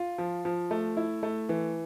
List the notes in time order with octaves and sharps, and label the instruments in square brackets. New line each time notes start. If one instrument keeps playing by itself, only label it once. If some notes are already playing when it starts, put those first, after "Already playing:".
Already playing: [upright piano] F4
F3
F3
A3
E4
A3
E3